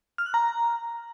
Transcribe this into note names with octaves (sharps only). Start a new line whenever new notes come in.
F6
F#6
A#5